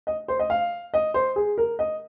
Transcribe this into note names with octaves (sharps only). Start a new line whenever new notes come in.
D#5
C5
D#5
F5
D#5
C5
G#4
A#4
D#5